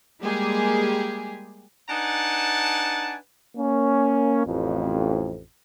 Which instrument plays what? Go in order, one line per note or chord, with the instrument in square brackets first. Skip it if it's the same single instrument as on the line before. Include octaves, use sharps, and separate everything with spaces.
[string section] G3 G#3 A#3 G4 G#4
[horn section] D4 D#4 B4 F#5 G#5 A5
[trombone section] A#3 C#4
A1 F2